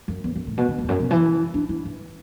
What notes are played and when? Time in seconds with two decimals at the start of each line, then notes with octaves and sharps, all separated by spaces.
0.08 F#2
0.24 E2
0.36 F#2
0.47 A2
0.58 B2
0.68 D3
0.79 F#2
0.84 E2
0.89 F#2
1.00 B2
1.11 E3
1.54 D4
1.69 E4
1.85 E3